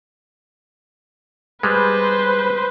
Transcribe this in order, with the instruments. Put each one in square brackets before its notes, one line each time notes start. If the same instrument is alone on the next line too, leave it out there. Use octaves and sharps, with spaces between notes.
[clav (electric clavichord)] G3 G#3 [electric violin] B4 C5